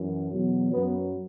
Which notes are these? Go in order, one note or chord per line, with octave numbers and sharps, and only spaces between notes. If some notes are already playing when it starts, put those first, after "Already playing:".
Already playing: F#2 E3
E2 B2 F#3
F#2 F#3 B3